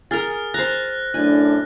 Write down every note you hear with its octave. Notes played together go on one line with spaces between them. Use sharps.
G#4 A#4 F6 A6
C5 A#5 F#6 A#6
F#2 A2 D4 G#5